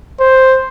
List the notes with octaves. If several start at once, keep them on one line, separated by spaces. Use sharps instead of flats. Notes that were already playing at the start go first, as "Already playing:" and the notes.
C5